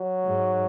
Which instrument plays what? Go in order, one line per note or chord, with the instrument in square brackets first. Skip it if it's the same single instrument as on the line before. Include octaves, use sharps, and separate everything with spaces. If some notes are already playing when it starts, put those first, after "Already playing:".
Already playing: [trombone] F#3
[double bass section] G#2